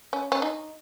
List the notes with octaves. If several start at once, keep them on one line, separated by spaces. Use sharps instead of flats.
C#4
C#4
D#4